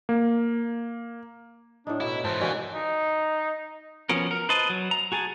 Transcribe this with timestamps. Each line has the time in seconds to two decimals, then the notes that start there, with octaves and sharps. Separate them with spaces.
0.09 A#3
1.87 A2 D4 D#4
2.01 B2 E4
2.24 G#2 E3 C5 A5
2.41 B2 D3 E3 A#3 C#4 G4 C#5
2.74 D#4
4.09 F3 B3 C#4 F#4 A#4
4.31 A#4
4.49 B4 C5 D#5 A5
4.70 F#3
4.91 A#5
5.12 F#4 G#4 G#5 A5